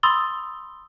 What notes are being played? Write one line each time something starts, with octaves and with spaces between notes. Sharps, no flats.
B5 C6 D#6 E6 A6 G7